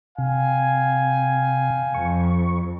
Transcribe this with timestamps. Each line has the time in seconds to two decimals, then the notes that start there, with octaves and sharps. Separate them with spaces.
0.18 C3 F5 G5 G#5
1.94 F2 C#6